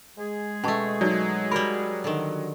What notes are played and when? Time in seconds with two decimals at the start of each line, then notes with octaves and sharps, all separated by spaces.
0.18 G#3 G#4
0.64 B2 A3 C#4 A5
1.01 F#3 D#4 D5
1.51 G3 A#4 D5 B5
2.04 D3 D#3